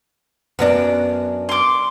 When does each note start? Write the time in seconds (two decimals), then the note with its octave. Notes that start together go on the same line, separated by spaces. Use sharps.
0.59 F#2 B3 D4
1.49 C6 D6